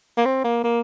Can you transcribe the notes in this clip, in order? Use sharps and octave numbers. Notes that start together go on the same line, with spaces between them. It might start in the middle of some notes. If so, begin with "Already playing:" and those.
A#3
C4
A#3
A#3